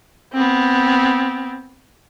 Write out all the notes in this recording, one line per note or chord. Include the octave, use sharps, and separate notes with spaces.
B3 C4